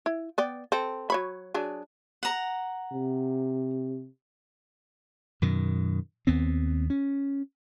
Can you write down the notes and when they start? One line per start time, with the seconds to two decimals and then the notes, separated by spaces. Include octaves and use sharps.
0.06 E4
0.38 B3 D5 G5
0.72 C4 A4
1.10 F#3 C#5 B5
1.54 F#3 D4 G#4
2.23 F#5 A#5
2.93 C3
5.42 F#2 B2 D#3
6.27 D#2 B3 C4
6.90 C#4